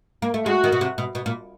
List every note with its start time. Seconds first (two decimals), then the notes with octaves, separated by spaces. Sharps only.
0.22 A#3
0.34 A3
0.46 G#3 F#4
0.64 D#3
0.72 B2
0.81 C3
0.98 B2
1.15 B2
1.26 A#2